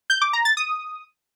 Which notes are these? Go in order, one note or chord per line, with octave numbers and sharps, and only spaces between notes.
G6
D6
A#5
A6
D#6